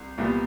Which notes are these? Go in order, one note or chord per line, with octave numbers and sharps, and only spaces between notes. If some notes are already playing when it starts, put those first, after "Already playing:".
Already playing: C2
C2 A#2 G3 B3